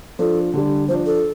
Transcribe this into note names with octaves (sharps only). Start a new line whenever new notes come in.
F3 D4 A4
D3 G3 D4
F3 D4 C5
A4